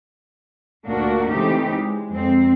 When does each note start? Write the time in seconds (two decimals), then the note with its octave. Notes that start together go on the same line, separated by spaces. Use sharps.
0.86 D2 A#2 A#3 D4 F#4
1.29 C#3 E3 A3 C4 D#4 G4
1.69 G#3
2.11 F2 C4